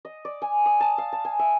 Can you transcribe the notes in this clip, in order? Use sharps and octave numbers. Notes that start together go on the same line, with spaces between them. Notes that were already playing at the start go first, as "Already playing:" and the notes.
D#5
D5
G#5
D#6
A5
F5
A5
G#5
E5